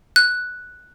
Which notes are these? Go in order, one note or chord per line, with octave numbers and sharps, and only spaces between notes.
F#6